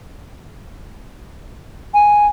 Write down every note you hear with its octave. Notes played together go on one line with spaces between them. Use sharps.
G#5